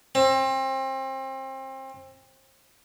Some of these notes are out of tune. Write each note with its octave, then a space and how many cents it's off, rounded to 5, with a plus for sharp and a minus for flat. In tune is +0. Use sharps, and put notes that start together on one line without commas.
C4 +30